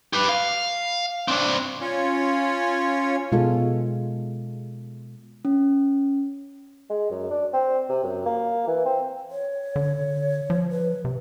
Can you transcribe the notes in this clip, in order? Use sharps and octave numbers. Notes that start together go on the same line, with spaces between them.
G4 B4
F5
C4 D4
C#4 F4 C#5
B2 G#3 F4 A4
C#4
G#3
F#2
D4
C4
C3
F#2
A#3
E3
C4
C#5
D3
F3
B4
C3